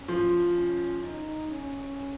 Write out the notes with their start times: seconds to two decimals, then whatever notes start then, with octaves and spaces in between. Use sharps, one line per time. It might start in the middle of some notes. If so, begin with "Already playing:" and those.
Already playing: C#4
0.08 F3
0.55 C#4
1.02 D#4
1.51 C#4